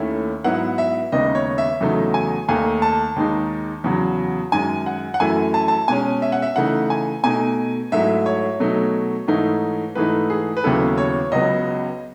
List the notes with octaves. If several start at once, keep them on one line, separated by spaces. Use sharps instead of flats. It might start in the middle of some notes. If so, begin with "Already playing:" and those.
Already playing: D#2 D#3 A3 C#4 E4
G#2 F#3 B3 E4 F#5
E5
D#2 C#3 G#3 B3 D#4 D#5
C#5
E5
E2 C#3 F#3 A3 D#4
G#5
D#2 D#3 A3 D#4 G#5
A5
D#2 D#3 G#3 D#4
E2 C#3 F#3
F#2 D#3 G#3 G#5
F#5
F#5
F#2 E3 A3 E4 G#5
A5
A5
B2 G#3 C#4 G#5
E5
F#5
E5
C#3 E3 A3 D#4 F#5
G#5
B2 A3 D#4 G#5
G#2 F#3 A3 E4 E5
C#5
B2 F#3 A3 D#4
G#2 E3 A3 D#4
G#2 E3 A3 D#4 B4
G#4
B4
D#2 C#3 F#3 B3 E4 A4
C#5
C#2 C#3 F#3 B3 D#5